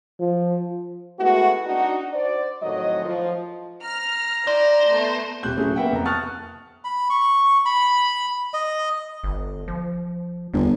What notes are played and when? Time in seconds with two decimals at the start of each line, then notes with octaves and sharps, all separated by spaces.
0.20 F3
1.20 G#3 A3 B3 E4 F#4
1.65 D4 D#4 F#4
2.13 C5 D5
2.62 F2 A2 D#3 F#3 D#5
3.06 F3
3.83 A#5 F6
4.47 E4 C5 D5
4.86 A3 B3
5.43 D#1 C3 G4 F#6 G6
5.57 F#3 A3 C#4 E4 G#4
5.76 A#3 B3 E5 F#5 G5
5.92 F2 A#5
6.05 A5 C#6 D#6 F6 F#6 A6
6.84 B5
7.10 C#6
7.65 B5
8.54 D#5
9.24 G1
9.68 F3
10.54 G1 E2